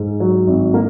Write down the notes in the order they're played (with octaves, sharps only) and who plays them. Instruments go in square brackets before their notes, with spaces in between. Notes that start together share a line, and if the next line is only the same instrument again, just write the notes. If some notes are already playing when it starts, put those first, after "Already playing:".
Already playing: [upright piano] G#2
F#3
G#1
A#3